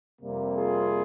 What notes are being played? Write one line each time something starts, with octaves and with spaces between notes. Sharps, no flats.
F2 C3 G3 A#3
F4 G#4